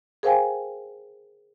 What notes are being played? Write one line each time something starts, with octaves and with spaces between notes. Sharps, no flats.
G#4 A#4 C5 F5 G5 G#5